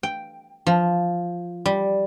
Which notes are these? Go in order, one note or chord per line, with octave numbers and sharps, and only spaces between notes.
G5
F3
G3